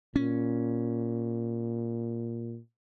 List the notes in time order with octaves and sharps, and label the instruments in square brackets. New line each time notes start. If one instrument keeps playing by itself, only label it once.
[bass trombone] A#2 [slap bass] C#4